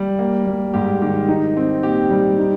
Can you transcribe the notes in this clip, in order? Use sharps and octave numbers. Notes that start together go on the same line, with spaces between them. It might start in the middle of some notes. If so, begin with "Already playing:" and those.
Already playing: G3
A#3
G3
G#2 G4
D#3 G4
D#4
C4
A#2 G4
G3
D#4